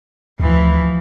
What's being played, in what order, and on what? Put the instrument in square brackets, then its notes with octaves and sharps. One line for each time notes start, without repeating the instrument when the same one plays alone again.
[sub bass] D2 [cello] E3 F3